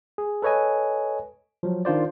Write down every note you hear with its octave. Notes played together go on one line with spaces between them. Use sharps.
G#4
A4 B4 C#5 D#5 G#5
F3 F#3
D#3 D4 F4 C5 D5